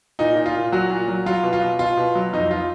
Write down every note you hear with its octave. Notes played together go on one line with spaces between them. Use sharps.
A#2 D#4
A#2
F4
A#2
F#3 F#4
A#2
F#3
F#3 F4
B2
F4
B2
B2 F4
B2
F#3
F2 D#4
F4